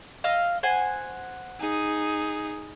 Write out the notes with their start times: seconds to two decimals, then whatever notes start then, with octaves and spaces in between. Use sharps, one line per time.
0.24 D#5 F5 E6
0.63 C5 F#5 G#5
1.60 D#4 G#4